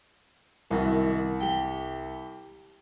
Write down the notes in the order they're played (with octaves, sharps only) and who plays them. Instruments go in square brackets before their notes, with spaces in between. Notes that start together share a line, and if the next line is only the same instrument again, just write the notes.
[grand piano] C2 [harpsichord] F#2 D#3
[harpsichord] G4 G5